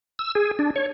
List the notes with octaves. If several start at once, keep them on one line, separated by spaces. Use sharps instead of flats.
E6
G#4
D4
C#5